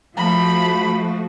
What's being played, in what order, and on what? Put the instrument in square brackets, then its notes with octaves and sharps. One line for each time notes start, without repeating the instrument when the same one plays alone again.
[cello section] F3 A3 F#4 [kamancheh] B5